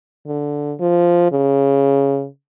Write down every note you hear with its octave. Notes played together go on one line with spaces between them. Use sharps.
D3
F3
C#3